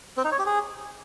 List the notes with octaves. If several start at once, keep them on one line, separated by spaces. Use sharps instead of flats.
C4
D#4
C#5
G4
G#4